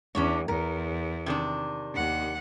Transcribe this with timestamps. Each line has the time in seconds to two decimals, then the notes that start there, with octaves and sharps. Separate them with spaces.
0.15 E2 C#4 D4 C#5
0.48 E2 A#4
1.26 C3 D#3 D4
1.94 D#2 F#5